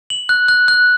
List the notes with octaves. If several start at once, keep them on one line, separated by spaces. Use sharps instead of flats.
F#7
F#6
F#6
F#6